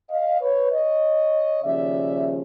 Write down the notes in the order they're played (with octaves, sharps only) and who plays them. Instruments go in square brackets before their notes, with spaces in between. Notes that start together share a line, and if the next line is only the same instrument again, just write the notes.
[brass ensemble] D#5 F5
B4 C#5
C#5 D#5
D#2 C#3 F3 D5 E5